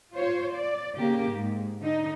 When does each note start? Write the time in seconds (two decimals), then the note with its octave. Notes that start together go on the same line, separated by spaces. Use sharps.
0.13 F4 C5 C#5
0.55 D5
0.98 C#3 A#3 G4
1.31 G#2
1.81 D3 D#4